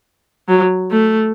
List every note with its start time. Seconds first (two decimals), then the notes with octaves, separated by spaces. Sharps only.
0.48 F#3
0.91 A3